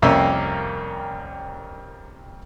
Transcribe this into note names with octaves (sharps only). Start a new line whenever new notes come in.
C2 F2 A#3 C#4 E5